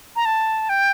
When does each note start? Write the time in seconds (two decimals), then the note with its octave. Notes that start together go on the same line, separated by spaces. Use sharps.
0.16 A#5
0.25 A5
0.69 G5